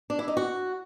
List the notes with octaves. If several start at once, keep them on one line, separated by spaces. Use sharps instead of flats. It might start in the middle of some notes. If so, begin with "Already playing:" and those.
D4
E4
D#4
F#4